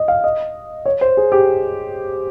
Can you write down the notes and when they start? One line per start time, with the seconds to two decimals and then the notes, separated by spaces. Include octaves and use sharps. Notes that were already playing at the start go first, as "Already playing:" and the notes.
Already playing: D#5
0.08 F5
0.24 D#5
0.86 C#5
1.01 C5
1.17 G#4
1.32 G4